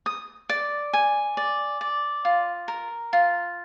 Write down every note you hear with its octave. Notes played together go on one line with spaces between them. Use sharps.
D#6
D5
G#5
D5
D5
F4
A#4
F4